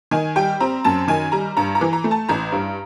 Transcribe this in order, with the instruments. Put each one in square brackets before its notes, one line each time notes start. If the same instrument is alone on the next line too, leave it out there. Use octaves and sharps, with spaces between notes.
[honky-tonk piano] D#3 G#5
G3 G5
C4 A#5
F#2 A5
D#3 G#5
G3 A#5
G2 A#5
A#5
E3
A#5
A3
A5
A1 A#5
G2